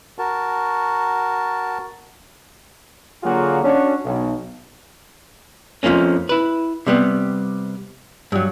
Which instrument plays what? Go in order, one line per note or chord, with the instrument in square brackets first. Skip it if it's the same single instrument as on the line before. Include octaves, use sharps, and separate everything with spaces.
[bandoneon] F#4 A#4 A5
[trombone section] D3 F#3 A#3 F4 F#4 G#4
C#4 D4 F#4
B1
[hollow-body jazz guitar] F2 F3 A3 A#3 C#4
E4 B4
C3 G3 B3
G2 F#3